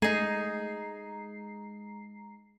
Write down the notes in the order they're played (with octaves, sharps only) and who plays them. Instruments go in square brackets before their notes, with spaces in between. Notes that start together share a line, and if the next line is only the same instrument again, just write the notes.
[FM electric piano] G#3 A#5 C7 [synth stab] A3 [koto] D#4 G#4